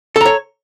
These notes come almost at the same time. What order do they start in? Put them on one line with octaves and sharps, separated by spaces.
A4 A#5 C#5